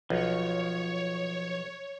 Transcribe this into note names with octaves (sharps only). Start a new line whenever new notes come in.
B1 F3 C#5